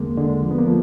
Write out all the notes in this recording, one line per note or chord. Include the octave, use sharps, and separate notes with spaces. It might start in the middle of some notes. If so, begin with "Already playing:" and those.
Already playing: E2 D3 G#3 A#3
D3 G#3
F3
B3
A#3
F3 A3